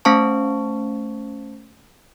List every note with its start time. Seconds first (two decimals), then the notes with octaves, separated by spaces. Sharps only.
0.05 A3 C#4 C5 F5 A5 C#6